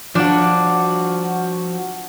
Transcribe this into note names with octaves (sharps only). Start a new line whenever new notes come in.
F3 D4 F#4